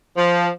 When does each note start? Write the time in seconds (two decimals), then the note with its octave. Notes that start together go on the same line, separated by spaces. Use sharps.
0.17 F3